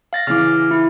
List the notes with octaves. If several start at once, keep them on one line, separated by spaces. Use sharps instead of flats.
F5 A6 A#6
C#3 E3 D6 F6
E4